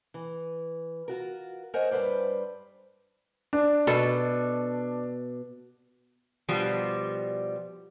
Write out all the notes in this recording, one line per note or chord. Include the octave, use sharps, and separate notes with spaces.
E3
F4 F#4 A#4
A#4 C5 C#5 D#5 F#5 G#5
G2 D#3 B4 C5 D5
D4
B2 A4
B2 F3 G3